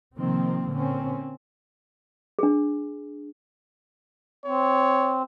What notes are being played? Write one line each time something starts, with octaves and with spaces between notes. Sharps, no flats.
C3 D#3 F3 A#3 C4
A#2 D3 A#3 C4 C#4
D4 G#4
C4 C#5